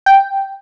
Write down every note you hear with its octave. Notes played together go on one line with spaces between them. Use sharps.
G5